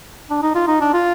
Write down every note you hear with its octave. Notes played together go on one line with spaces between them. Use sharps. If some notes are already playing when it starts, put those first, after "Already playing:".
D4
D#4
F4
D#4
D4
F4